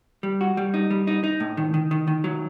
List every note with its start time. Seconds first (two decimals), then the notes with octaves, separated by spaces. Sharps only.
0.23 G3
0.41 F#4
0.57 G3
0.74 D#4
0.90 G3
1.07 D#4
1.24 D#4
1.40 A2
1.57 D#3
1.74 D#3
1.91 D#3
2.08 D#3
2.24 F#3